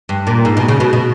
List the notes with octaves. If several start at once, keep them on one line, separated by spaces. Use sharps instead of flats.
G2
A#2
G#2
B2
C#3
B2
B2